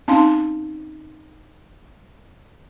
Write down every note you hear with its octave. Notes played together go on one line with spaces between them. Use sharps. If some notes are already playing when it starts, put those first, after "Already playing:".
C4 C#4 D#4 F5 C6